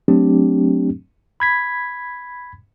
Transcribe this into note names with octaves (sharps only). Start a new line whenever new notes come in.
F#3 A3 C4 D4 G4
B5 G#6 B6